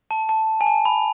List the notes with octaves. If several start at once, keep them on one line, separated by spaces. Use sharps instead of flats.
A5
A5
G#5
A5
B5